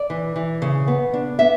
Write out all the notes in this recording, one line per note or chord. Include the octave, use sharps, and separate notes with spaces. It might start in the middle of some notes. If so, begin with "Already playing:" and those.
Already playing: D5
E3
E3
C#3
B3
D4
B3 E5